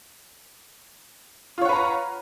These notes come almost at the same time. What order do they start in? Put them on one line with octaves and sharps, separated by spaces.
F4 C#5 F#5 B4 A#5